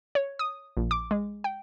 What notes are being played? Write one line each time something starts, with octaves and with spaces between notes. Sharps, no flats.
C#5
D#6
A#1
D6
G#3
G5